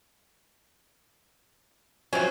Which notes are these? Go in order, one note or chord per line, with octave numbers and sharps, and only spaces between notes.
C3 F3 F#3 C#4